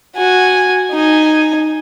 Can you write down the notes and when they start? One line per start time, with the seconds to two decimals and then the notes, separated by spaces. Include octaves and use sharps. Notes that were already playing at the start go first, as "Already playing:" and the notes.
0.16 F#4 G#5
0.92 D#4 G#5